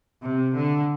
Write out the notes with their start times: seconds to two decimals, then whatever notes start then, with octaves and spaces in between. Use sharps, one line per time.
0.22 C3
0.56 D3